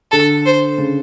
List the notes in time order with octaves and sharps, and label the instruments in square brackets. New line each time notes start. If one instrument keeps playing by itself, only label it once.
[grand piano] D3 [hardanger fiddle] A4
[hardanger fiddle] C5
[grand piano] C#3